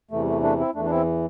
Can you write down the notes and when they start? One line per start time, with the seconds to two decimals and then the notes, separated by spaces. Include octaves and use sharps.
0.11 E2 C3 E3 A3
0.22 G3
0.27 A3
0.43 A3 D4
0.59 C4 E4
0.74 E2 A3 D4
0.79 E3
0.85 D4
0.91 C4 E4